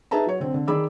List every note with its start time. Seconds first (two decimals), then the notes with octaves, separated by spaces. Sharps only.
0.11 D#4 G#4 B4 E5 A5 A#5
0.27 F#3 C#5
0.40 D3 C4
0.54 D3
0.68 D#3 G#4 D5 B5 D6 E6